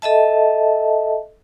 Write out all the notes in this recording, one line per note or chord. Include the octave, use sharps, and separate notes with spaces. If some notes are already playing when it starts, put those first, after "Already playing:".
A4 D#5 E5 A5